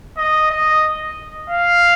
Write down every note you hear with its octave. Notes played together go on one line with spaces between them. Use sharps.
D#5
D#5
F5